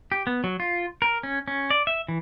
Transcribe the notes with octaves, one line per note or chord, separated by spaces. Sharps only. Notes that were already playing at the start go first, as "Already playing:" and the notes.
G4
B3
F#3
F4
A#4
C#4
C#4
D5
E5
E3